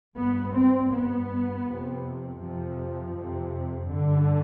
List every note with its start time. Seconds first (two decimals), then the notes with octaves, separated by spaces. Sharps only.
0.17 G2 B3
0.54 C4
0.91 G2 B3
1.65 F2 C3
2.40 F2 C3 F3
3.14 F2 C3
3.88 G2 D3